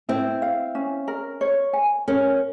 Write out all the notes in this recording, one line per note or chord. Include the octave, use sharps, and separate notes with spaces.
C4 E4
F5
C#4
A#4
C#5
G#5
C#4 A#4